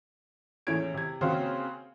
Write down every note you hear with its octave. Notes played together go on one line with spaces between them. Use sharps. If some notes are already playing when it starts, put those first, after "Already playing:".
E2 A2 A3 C#4 G#6 D7
C3 G#6
C#3 A#3 C4 C#4 F#4 C5